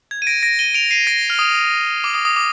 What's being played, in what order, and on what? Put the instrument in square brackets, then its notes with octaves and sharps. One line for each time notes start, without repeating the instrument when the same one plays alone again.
[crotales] G#6
D#7
A#6 D7
A#6 D7
D#7 G7
D7 F7
C7 D#7
A#6 D7
F6
D#6
D6
D#6
D#6
D6